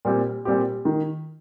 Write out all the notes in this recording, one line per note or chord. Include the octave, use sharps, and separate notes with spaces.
A#2 G3 C4 G4
A#2 G3 C4 G4
D#3